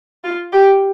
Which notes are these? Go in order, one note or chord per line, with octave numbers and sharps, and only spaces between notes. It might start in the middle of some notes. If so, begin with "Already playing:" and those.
F4
G4